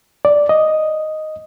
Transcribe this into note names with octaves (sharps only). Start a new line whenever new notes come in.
D5
D#5